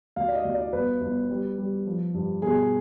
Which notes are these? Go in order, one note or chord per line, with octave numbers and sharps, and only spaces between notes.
D2 F5
D5
D#5
D2
D5
G1 B4
G1
G3
G3
F3
G2
B2 G#4